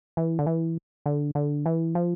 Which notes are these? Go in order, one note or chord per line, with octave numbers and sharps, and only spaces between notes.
E3
D3
E3
D3
D3
E3
F3